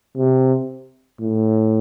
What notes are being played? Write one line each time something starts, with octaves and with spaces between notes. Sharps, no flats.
C3
A2